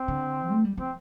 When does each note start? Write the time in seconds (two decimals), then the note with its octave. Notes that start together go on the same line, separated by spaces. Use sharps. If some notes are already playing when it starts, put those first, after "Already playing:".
Already playing: C4
0.08 D3
0.50 A3
0.65 G3
0.77 F3 C4